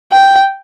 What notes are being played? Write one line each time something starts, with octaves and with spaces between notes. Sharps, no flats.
G5